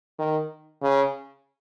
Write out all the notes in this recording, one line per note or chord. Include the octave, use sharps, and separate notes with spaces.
D#3
C#3